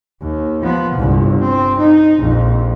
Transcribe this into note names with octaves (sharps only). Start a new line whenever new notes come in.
D#2
F3 B3
G1 C2
C4
D#4
A#1 F2